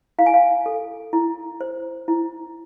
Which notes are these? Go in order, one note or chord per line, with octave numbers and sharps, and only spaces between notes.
E4 F5
G#5
F5
A4
E4
C5
E4